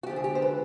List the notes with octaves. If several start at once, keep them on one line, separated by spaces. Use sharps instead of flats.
F#4
D3 F3 G#3 G4
G#4
G4
C5
B4